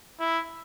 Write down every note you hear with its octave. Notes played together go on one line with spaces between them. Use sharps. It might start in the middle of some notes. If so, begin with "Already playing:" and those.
E4